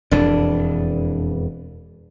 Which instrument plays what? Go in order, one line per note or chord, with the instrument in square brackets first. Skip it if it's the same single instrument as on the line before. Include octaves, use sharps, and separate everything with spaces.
[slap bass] E1 F2 E3 [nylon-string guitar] D4